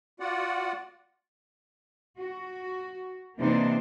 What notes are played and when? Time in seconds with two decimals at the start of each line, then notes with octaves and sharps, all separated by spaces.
0.20 F4 F#4 D5 F#5
2.17 F#4
3.38 C3 E3 A#3 D4 D#4 C5